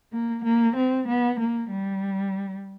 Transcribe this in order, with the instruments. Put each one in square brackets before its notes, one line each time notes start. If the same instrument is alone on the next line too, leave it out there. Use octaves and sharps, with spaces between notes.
[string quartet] A#3
A#3
C4
B3
A#3
G3